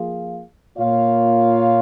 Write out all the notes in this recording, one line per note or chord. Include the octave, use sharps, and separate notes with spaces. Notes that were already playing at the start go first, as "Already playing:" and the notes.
Already playing: F3 A#3 F4 G#4 F5
A#2 A#3 F4 C#5 F5